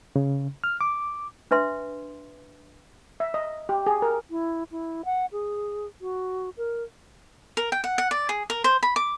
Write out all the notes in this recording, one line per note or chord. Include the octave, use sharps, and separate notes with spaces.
C#3
F6
D6
D4 B4 E5 C6
E5
D#5
G4
G#4
A#4
E4
E4
F#5
G#4
F#4
A#4
A#4
G5
F#5
F#5
D5
G#4
A#4
C5
B5
D6